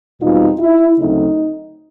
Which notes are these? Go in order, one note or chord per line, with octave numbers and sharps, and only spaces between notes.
E2 B2 G3 C4 D#4 F4
E4
D2 C#3 F#3 A3 C4 D#4